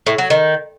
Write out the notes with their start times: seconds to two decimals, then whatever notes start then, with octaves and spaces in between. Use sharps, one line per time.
0.06 A2
0.18 F#3
0.30 D#3